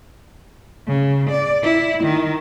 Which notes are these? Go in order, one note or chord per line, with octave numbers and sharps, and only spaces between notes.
C#3
D5
E4
D#3